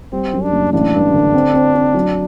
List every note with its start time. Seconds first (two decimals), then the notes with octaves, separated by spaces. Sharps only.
0.13 G3 C4
0.33 F#2
0.43 D4
0.52 F#1
0.73 A1 D4
0.93 G2
1.13 D3
1.34 C4
1.54 C4
1.75 C4
1.94 F#3